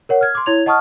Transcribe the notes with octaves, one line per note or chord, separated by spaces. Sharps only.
A#4 C#5 F#5
F6 G#6
C6 D6
E4 C#5 G#6 F7
D#5 F#5 A5 C#6 D#6 F6